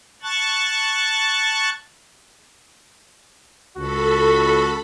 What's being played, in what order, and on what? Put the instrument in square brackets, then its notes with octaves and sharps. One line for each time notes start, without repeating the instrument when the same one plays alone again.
[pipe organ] A5 C#6 F#6 A6
[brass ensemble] C#2 [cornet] F#4 [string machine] A4 B5